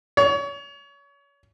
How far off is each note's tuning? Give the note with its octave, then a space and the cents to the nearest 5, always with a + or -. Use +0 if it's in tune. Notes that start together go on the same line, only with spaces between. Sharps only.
C#5 +30